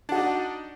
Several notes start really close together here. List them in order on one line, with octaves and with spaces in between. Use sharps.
D4 F#4 D#4 D5